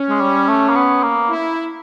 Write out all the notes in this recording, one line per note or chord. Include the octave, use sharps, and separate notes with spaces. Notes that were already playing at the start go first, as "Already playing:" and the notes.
Already playing: C#4
G#3
G3
A3
A#3
B3
A#3
E4